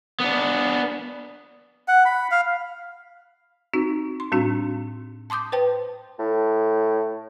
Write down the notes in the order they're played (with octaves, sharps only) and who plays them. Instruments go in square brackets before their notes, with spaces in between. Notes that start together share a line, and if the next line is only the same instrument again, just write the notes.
[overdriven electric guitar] B3 D4
[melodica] F#5
B5
F5
[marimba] C4 D#4 F#4
C6
A2 G3 C4 D4 F#4
A5 C6 D6 D#6 G6
B4 C5 G5 A5
[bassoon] A2